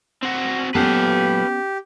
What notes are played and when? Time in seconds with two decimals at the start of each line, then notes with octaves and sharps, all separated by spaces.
0.23 C4 F#4
0.75 F#2 A#2 B3 C#4 G4 A4 B4 F5